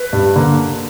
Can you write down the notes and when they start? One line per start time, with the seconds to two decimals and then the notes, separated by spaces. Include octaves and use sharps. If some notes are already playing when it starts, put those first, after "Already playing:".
Already playing: B4
0.13 G2
0.36 D3 A#3